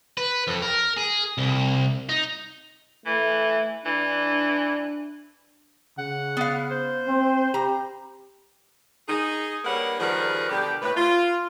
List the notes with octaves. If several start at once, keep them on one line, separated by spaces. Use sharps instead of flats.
B4
F2
A#4
G#4
C2
D#4
E3 A3
E3 D4
C#3 F#5
B3 F5
C5
C4
G4 A#5
D#4 G#4
G3 A#3 D4 B4 C#5 F#5
D#3 F3 G3 G#4 A#4 B4
B2 D3 G3 G4
A2 B4
F4